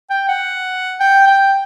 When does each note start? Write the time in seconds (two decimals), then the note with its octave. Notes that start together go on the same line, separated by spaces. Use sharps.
0.10 G5
0.29 F#5
1.00 G5
1.27 G5